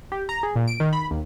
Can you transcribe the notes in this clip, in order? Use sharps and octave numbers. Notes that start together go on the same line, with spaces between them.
G4
A#5
G#4
A#2
D7
D#3
B5
D#2